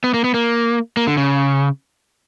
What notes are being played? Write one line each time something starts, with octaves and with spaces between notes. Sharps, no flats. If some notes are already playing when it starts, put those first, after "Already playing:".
B3
A#3
B3
A#3
A#3
D3
C#3